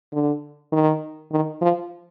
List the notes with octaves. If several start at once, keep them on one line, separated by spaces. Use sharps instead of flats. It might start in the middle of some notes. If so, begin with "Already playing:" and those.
D3
D#3
D#3
F3